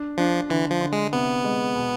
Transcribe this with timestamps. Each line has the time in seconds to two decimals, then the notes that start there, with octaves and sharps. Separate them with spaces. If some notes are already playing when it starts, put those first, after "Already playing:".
Already playing: D4
0.18 F3 D4
0.49 D3 E3
0.71 F3
0.81 D3
0.92 G#3
1.13 C3 B3
1.44 G#3
1.75 B2